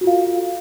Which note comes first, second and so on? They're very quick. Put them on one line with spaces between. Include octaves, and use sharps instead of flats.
F#4 F4 F5 A4